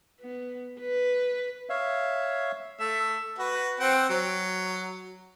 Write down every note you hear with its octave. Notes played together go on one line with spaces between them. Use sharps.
B3
B4
C#5 E5 F5
A3 E5
F#4 B4
C4 F#5 G5
F#3